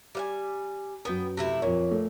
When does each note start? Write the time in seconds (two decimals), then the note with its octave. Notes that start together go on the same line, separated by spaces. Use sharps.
0.15 G3 F5 G#5
1.05 F#2 B3 B4 G5
1.37 C3 A3 E4
1.62 F2 A#2 A#4 C#5
1.91 A3